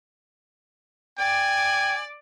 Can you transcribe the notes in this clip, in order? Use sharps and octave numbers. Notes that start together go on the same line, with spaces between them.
D5 G5 G#5 D6